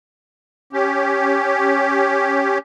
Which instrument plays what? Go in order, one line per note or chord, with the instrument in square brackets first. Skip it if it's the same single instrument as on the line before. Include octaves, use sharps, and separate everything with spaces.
[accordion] C#4 G4